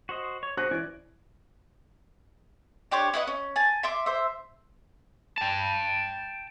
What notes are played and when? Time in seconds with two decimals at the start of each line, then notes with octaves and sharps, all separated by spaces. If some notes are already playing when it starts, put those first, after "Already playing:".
0.09 F#4 C5 D#5
0.43 C#5
0.57 F#4 G#4 C5 F#6 A#6
0.71 E3 C#4 D5 G#5
2.91 D4 G4 C5 C#5
3.14 E4 B4 D#5 F#5
3.27 C#4
3.56 G#5 A5
3.83 E5 C6 D6
4.06 C5 E5
5.38 G5 A5